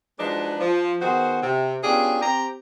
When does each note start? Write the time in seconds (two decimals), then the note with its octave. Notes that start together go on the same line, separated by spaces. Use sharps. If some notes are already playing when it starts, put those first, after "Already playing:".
0.19 F3 F#3 G#3 D4 D#4 B4
0.60 F3
1.02 D#3 B3 F#4 G#4 C5
1.42 C3
1.83 B3 C#4 D4 F4 G4 G#4
2.21 C4 G4 A#5